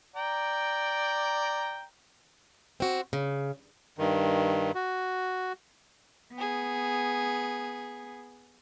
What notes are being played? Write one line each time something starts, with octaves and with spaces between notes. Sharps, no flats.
D5 G5 A#5
C4 F#4
C#3
G2 D#3
F#4
B3 G#4